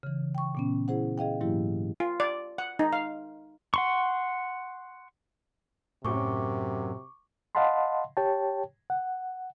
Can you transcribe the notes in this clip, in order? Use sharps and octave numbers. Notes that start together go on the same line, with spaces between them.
C#3 E3
G5 C#6
A#2 B3 C#4
E4 G#4 C5 F#5
G#4 D#5 F5 G5
G#2 E3 F#3 A#3 E4 G4
F4
D5
F#5
D#4
F5
F#5 C6 C#6
F#2 A2 C3 C#6 D6
D#5 F5 F#5 A5 B5 C6
G4 C#5 G5 A5
F#5